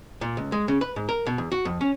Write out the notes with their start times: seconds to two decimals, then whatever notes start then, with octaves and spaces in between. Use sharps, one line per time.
0.21 A#2
0.37 C#2
0.52 G#3
0.68 C#3
0.81 B4
0.96 G#2
1.09 A#4
1.26 B2
1.38 E2
1.52 F#4
1.65 F2
1.81 C#4